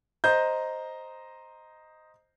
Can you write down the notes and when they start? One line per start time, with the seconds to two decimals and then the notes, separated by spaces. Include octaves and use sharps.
0.24 C5 D#5 A#5 G6